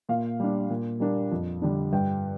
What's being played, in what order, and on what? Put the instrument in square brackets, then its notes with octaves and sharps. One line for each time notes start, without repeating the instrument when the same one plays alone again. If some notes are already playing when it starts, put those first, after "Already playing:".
[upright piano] A#2 F5
G3 D4
A#2
G3 A#3 D4
F2
D3 G3 D4
G2 G5